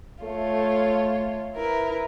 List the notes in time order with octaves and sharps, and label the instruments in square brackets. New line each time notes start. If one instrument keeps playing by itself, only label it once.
[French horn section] A3 [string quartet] F4 C#5
[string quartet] E4 A#4 B4